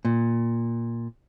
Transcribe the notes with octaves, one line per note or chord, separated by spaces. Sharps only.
A#2